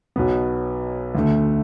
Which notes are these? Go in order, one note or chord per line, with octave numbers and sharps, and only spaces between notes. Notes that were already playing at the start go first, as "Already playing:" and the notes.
B1 B2 F#3 B3
D2 D3 A3